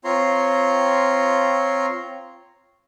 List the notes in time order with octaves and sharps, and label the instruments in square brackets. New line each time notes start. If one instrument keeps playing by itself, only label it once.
[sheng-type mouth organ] C4 F4 C#5 A#5 C6